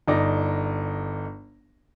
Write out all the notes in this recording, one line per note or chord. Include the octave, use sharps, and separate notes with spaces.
G1 D#4 D5 D6 A#6